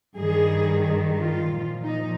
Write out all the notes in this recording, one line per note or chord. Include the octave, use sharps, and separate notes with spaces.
G2 D#3 G#4
F4
A#2 F3
D#4